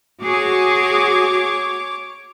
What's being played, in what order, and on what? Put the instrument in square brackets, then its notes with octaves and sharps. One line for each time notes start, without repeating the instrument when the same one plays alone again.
[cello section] F#4 G#4 [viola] C#5 D6